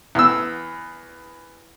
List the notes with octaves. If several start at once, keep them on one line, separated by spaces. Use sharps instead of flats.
E2 E6